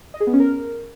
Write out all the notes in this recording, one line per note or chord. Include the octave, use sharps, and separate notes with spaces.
D#5
G#4
B3
C#4
A#4